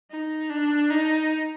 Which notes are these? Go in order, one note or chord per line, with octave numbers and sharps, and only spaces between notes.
D#4
D4
D#4